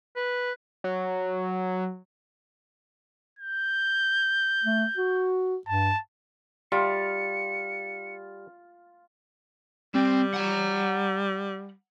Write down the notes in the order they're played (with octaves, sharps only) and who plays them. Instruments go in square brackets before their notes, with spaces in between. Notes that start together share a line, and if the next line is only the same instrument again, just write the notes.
[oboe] B4
[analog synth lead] F#3
[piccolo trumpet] G6
[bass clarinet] A3
F#4
[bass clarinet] G2 [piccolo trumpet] A5
[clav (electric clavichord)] G3 [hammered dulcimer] F4 [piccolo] C#7
[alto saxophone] G3 [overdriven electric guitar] C4
[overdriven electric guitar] F#5 A#5